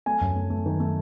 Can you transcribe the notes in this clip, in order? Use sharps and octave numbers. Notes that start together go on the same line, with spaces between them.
A3 G#5
F#2
A3
A3
D#3
A3